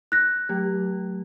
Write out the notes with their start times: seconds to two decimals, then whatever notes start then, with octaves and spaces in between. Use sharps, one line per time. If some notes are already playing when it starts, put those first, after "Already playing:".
0.12 F#6 A#6
0.49 F#3 A3 G4